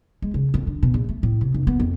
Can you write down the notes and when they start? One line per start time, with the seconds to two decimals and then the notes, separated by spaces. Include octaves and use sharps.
0.22 G#3
0.34 C#3
0.54 F2
0.67 D3
0.83 B2
0.94 A#1
1.09 A3
1.23 A2
1.41 C3
1.54 F1
1.67 B3
1.80 F2